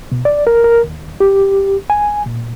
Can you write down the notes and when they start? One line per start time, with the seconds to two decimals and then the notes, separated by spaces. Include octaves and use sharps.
0.12 B2
0.25 D5
0.47 A#4
0.64 A#4
0.84 D#2
1.20 G4
1.90 G#5
2.26 A#2